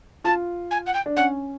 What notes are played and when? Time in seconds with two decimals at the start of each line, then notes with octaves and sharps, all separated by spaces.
0.24 F4 A5
0.70 G#5
0.86 F#5
0.93 G5
1.06 D4
1.16 C#4 F#5